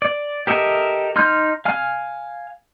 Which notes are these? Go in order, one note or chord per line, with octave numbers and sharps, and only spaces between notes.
D5
G4 A4 A#4 D#5 E5
D#4 C6 F6 G6
F5 G#5 F6